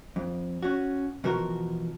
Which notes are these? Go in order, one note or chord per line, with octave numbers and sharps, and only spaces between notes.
F2
C#4 F#4
B2 E3 F3 F#4 A#4